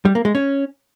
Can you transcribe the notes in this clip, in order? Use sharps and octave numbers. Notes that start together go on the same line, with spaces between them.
G3
A#3
G#3
C#4